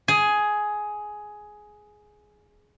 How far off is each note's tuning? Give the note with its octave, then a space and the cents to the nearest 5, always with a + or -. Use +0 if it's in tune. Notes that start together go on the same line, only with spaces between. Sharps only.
G#4 +10